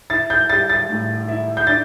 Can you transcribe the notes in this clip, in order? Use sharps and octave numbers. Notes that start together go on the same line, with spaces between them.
E4 A6
G6
G3 A6
A6
A2
E4
G6
D4 A6